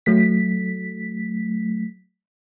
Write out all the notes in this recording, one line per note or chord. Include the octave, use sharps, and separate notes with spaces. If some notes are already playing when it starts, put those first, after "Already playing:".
F#3 A3 B6